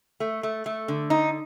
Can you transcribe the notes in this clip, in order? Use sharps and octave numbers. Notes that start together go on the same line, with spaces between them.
A3
A3
A3
D3
D#4